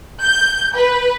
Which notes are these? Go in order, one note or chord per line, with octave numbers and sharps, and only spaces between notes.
G6
B4